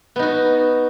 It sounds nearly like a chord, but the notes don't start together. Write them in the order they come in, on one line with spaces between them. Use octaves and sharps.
B3 D#4 F#4